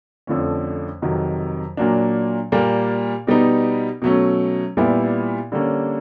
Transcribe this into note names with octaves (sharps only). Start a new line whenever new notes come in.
F2 D3 F3 A3 C#4
F2 C3 D#3 F#3
A#2 F#3 A#3 D4
A#2 G3 A#3
B2 G3 B3 D#4
B2 F#3 A3 C#4
A#2 G3 B3 E4
D3 G3 A#3 C#4